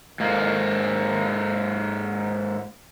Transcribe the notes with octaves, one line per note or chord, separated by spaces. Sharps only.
G#2 A#3